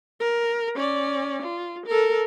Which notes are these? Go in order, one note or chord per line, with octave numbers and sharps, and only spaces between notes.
A#4
C#4 D5
F4
A4 A#4